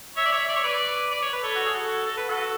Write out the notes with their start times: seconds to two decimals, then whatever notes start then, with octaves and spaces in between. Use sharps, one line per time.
0.16 C#5 E5
0.25 D5
0.32 C#5 E5
0.49 D5
0.56 C#5
0.64 B4 D5
1.12 D5
1.22 C#5
1.33 B4
1.43 A4 C#5
1.56 F#4
1.66 G#4
1.74 F#4 A4
2.06 A4
2.17 B4
2.28 F#4 A4